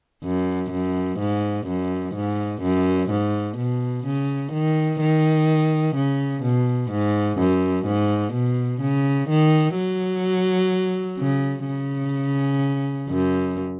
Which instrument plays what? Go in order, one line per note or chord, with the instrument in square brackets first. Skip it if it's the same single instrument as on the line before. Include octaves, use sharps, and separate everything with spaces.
[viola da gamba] F#2
F#2
G#2
F#2
G#2
F#2
G#2
B2
C#3
D#3
D#3
C#3
B2
G#2
F#2
G#2
B2
C#3
D#3
F#3
C#3
C#3
F#2